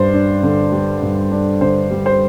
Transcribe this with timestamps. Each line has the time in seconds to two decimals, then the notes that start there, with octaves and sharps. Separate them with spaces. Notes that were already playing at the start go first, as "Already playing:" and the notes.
Already playing: G2 G3 C5 D5
0.14 D4
0.43 D3
0.72 G3
1.02 G2
1.32 D4
1.61 D3 C5
1.91 G3
2.06 C5